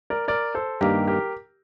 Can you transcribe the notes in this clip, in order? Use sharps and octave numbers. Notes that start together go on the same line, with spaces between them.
A#4 D5
A#4 D5
A4 C5
G2 D#3 A#3 G4 A#4
G4 A#4